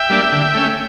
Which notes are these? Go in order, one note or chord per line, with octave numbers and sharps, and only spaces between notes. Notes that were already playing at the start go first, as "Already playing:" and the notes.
Already playing: E5 G5
G3 A#3 D4
D3
A3 C#4